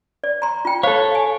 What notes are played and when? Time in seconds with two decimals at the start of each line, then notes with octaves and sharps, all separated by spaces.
0.24 D5
0.42 A#5 C6
0.65 F4 G5
0.83 A4 C5 C#5 F5
1.12 F5 G#5